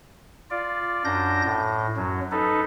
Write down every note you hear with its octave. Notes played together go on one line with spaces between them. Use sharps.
F4 D5
F#2 D4 G6 A#6
A2
F#2 F#3
D#4 A4 B4